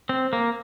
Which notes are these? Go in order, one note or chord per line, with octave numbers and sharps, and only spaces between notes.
C4
A#3